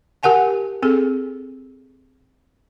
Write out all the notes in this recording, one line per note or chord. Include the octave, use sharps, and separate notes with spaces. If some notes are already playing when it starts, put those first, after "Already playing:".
G4 A#4 F#5 G#5 A5
C4 G#4 A4